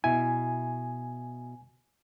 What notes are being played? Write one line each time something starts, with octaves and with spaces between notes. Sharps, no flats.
B2 E4 G#5